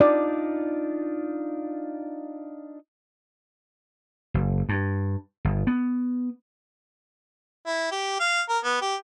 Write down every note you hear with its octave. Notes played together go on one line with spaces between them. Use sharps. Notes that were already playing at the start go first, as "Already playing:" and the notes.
D4 D#4 F4 D5
F#1
G2
G1
B3
E4
G4
F5
A#4
B3
G4